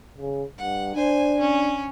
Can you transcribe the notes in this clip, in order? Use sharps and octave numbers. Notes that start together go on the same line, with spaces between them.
C#3
G2 F#5
D4 C5 G#5
C#4